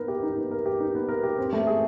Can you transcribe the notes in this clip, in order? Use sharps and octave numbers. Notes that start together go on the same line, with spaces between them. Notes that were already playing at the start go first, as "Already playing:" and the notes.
Already playing: B3 D#4 A#4
G4
D#4
B3
A#4
G4
D#4
B3
A#4
G4
C4
A3
G#4